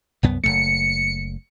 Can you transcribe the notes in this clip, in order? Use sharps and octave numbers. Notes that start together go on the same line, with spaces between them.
C2 F#2 B3
F#1 E2 A3 C#7